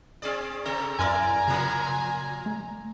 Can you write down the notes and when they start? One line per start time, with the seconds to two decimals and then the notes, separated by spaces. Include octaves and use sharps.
0.22 C4 G#4 D5
0.65 C3 C4 A4 A#5
0.99 F#2 E4 A#4 D5 G#5
1.48 A#2 C#3 F3 A#3
2.46 A3